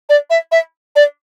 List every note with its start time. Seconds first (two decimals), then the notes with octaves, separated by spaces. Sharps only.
0.09 D5
0.30 E5
0.52 E5
0.96 D5